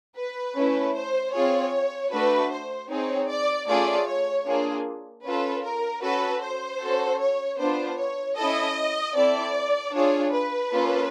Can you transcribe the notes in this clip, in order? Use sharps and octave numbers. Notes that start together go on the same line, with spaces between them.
B4
A3 C#4 E4
C5
C4 F4 G#4 C#5
A3 D4 F#4 B4
C5
C4 D#4 G#4 C#5
D5
A3 C#4 F4 G#4 D5
C#5
A#3 D4 F4 G#4
C#4 F4 A4 B4
A#4
C#4 F#4 A4 B4
C5
C#4 F#4 A4
C#5
B3 D4 F4 C5
C#5
C#4 E4 A4 D#5
C4 E4 A4 D5
D4 F4 G#4 C#5
B4
A#3 C#4 F4 A4